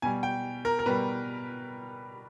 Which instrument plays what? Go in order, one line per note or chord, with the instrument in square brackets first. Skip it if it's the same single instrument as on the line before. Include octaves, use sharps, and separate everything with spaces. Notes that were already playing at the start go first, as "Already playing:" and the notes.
[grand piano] B2 G3 G#5
G5
A#4
A#4
B2 G3 B4